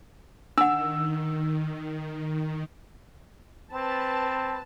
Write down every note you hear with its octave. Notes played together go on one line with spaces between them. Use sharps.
D#3 D4 F#5 E6
C4 B4 A5